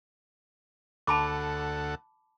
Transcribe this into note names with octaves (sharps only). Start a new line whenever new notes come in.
D2 A4 F#5 A5 B5 D6